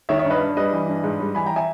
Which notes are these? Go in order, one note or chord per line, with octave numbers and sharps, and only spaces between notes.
D#3 C#5 E5
C#5 E5
G2
B4 D#5
G2
G3 B4 D#5
E3
G2
G#2
G3
E3 G#5 B5
G5 A#5
E5 G#5